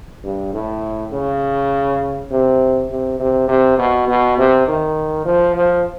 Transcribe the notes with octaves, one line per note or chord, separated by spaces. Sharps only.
G2
A2
C#3
C3
C3
C3
C3
B2
B2
C3
D#3
F3
F3